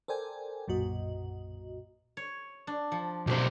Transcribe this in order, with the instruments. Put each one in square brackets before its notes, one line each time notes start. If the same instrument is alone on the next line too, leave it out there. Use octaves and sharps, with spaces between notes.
[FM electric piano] A4 A#4 C5 D5 G5 G#5
B1 F#2 A#2 F#4 D#5
[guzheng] C#5
D4
F3
[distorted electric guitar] B1 C5 [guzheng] C4 G4